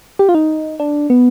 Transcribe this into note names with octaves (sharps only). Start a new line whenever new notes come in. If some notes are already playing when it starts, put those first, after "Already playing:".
G4
F4
D#4
D4
B3